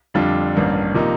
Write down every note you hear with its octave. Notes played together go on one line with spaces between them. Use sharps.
F2 D3 G3 D4 F4
A1 G2 D#3 A#3
C3 F3 A#3 D#4